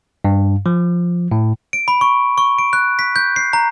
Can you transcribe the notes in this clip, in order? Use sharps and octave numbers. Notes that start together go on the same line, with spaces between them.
G2
F3
A2
D7
B5
C#6
C#6
D7
F#6
B6
G6
C7
A#5